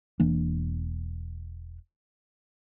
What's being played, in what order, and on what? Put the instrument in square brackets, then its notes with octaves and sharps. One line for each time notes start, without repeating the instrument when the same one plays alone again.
[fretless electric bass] E1 E3 A#3 D4